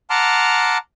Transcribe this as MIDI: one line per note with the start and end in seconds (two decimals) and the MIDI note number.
0.10 0.78 78
0.10 0.78 81
0.10 0.78 82
0.10 0.78 84
0.10 0.78 86
0.10 0.78 89